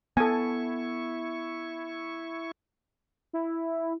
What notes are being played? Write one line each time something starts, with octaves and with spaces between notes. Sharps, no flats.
B3 E4 A4 G#5 C#6
E4